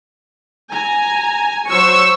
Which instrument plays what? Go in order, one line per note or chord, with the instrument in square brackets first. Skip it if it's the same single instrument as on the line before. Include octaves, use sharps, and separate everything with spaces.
[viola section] G#5 A#5
[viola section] F#3 C5 [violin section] C#6 E6